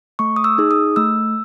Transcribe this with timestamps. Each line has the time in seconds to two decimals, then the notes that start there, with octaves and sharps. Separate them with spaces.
0.19 A3 C#6
0.36 D#6
0.44 E6
0.58 D#4 G#4
0.71 D#6
0.96 A3 E6